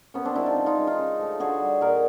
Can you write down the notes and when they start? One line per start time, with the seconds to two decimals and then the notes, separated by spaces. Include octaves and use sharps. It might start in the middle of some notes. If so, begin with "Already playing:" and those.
0.14 C3 B3 C#4
0.25 C4 D4
0.35 F3 G#3 D4 E4
0.46 D#4 F4
0.56 C#3
0.66 D#4 F4
0.77 E3 G#3
0.87 D#4 F4
0.98 C#3
1.19 F3 A3
1.40 D3 F#4 G#4
1.60 G3
1.81 A#2 G#4 A#4